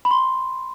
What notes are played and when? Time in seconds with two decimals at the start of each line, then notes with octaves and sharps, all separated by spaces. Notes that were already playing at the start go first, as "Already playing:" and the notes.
0.05 B5
0.11 C6